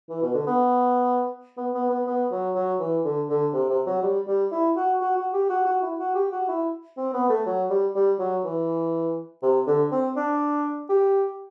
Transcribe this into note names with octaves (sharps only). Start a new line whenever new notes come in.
E3
B2
D3
B3
B3
B3
B3
B3
F#3
F#3
E3
D3
D3
C3
C3
F#3
G3
G3
E4
F#4
F#4
F#4
G4
F#4
F#4
E4
F#4
G4
F#4
E4
C4
B3
A3
F#3
G3
G3
F#3
E3
C3
D3
C4
D4
G4